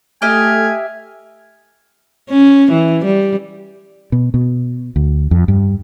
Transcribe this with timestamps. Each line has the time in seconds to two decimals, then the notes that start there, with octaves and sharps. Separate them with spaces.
0.22 A3 G4 D#5 E5 G#5 F6
2.30 C#4
2.71 E3
3.05 G3
4.12 B2
4.34 B2
4.96 D2
5.31 F2
5.48 G2